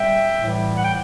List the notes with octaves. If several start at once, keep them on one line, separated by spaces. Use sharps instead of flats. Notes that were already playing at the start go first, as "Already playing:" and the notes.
Already playing: G3 E5 G5
A2 E3 G3
F#5
G5